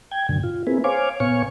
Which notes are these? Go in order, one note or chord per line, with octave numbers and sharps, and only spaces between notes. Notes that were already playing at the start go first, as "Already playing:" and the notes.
G5 G#6
F#2 A#2 D3
F4
A#3 C4 E4 G#4 B4
C5 C#5 F5 G#5 D6
A#2 B3 C#5 F5 G#5 C#6